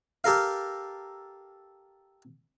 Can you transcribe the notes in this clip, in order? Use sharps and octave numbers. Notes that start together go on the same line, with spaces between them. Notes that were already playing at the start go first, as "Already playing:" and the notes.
G4 A4 A#4 F5